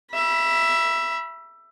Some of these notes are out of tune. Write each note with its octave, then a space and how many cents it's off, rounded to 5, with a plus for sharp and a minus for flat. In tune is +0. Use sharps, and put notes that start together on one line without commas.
E5 +15 B5 -25